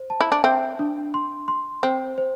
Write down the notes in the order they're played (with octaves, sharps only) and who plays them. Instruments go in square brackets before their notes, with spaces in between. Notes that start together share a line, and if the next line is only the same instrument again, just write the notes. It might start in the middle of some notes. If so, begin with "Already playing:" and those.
Already playing: [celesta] C5
A5
[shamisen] E4
D4
[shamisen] C4 [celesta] E5
[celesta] D4
C6
C6
[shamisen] C4 [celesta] C5
[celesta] C5